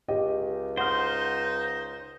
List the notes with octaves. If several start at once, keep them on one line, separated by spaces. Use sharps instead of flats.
C#2 G4 D#5
D#4 C5 F#5 F6